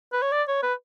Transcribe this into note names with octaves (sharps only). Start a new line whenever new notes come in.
B4
C#5
D5
C#5
B4